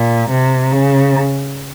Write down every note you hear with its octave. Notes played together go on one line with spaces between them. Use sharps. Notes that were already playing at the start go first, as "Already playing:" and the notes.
Already playing: A#2
C3
C#3